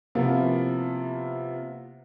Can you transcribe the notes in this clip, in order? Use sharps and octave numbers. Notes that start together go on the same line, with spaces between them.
C3 F3 A#3 B3 E4 F4